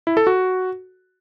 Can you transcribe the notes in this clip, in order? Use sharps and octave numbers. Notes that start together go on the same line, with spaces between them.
E4
A4
F#4